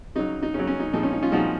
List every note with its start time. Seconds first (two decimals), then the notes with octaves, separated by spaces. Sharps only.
0.15 C#3 F#3 D#4
0.43 D#4
0.54 C#3 F#3 C#4
0.67 C#4
0.80 D#4
0.93 A#2 F3 G#3 D#4
1.03 C#4
1.13 D#4
1.23 C#4 F4
1.32 A#2 F3 G#3 D#4 F#4